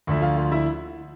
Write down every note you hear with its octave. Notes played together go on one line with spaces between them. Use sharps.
D2 D3 F3 E5
F4 F5
F4 F5
E4 E5